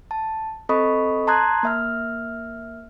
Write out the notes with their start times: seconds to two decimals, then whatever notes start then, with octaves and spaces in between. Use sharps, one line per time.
0.11 A5
0.69 C4 A4 D#5 B5 C#6 D#6
1.27 A5 A#5 C6 D#6 F#6 G#6
1.63 A#3 E5 F6